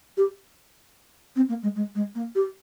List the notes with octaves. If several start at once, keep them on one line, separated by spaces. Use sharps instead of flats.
G4
C4
A#3
G#3
G#3
G#3
A#3
G4